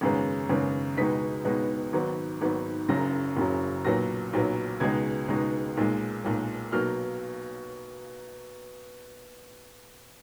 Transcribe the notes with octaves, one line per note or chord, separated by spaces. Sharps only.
G#1 F#2 C#3 G#3 B3
G#1 F#2 C#3 G#3 B3
C#2 B2 G#3 B3 D#4 B6
C#2 B2 G#3 B3 D#4
G#1 G#2 D#3 F#3 B3
G#1 G#2 D#3 F#3 B3
F#1 F#2 C#3 F#3 A#6
F#1 F#2 C#3 F#3
B1 A#2 F#3 B3 A#6
B1 A#2 F#3 B3
C#2 B2 G#3 D#4 G#6
C#2 B2 G#3 D#4
B1 A#2 G#3
B1 A#2 G#3
B1 B2 F#3 A#3 F6